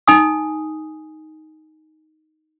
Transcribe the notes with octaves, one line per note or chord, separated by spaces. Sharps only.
D#4 G#5 D#6